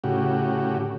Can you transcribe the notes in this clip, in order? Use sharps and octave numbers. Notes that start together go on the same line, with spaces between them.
A2 C#3 F#4 G4